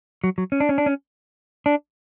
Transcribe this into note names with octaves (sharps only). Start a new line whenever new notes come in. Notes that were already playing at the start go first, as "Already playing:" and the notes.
F#3
F#3
C#4
D4
C#4
D4
C#4
D4